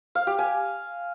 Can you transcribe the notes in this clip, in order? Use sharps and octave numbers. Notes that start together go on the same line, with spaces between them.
F5
G4
G#5